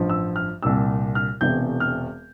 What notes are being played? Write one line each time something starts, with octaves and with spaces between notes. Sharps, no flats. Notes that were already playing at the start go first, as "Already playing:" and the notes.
Already playing: A1 G2 F3
E6
F6
C2 A#2 G3 E6
F6
E1 E2 C3 G6
F6